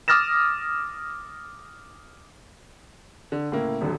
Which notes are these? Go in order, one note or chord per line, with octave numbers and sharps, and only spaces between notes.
D6 D#6 F6 A6 A#6 E7
D3
A2 C#3 A#3 E4
D#1 D#2 D3 F#3